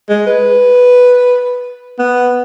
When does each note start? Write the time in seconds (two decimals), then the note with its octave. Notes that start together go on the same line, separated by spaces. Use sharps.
0.09 G#3
0.26 B4
1.99 B3